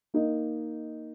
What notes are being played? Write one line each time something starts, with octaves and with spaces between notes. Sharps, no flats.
A#3 D#4 A#4 D#5